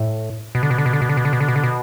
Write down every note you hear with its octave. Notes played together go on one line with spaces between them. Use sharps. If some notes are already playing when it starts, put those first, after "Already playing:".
Already playing: A2
B2
D3
B2
D3
B2
D3
B2
D3
B2
D3
B2
D3
B2
D3
B2